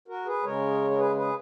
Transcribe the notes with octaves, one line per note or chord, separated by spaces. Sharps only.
F#4 A#4
G#4 B4
C#3 G#3 A#4 C#5
A#4
G#4 B4
G#4 B4